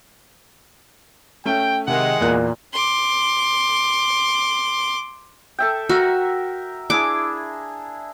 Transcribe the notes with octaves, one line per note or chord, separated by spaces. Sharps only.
A3 C#4 G5
C3 D#3 G#3 F#5
E2 A#2 A#3 F#6
C6 D6
A4 E5 G5
F#4 A#4 E5 A#5
D4 E4 G#4 D6